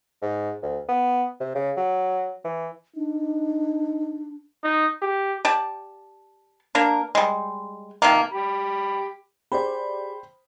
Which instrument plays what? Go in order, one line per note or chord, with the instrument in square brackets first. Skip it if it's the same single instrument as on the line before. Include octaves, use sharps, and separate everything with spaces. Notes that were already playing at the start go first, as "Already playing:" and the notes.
[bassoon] G#2
D2
B3
C3
C#3
F#3
E3
[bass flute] D4 [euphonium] D#4
[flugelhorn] D#4
G4
[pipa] G4 D5 A5
A#3 D4 A#4
G3 G#3
C3 D#3 F3 A#3
[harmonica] G4 B5
[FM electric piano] G4 G#4 D5 [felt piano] C5 G5 B5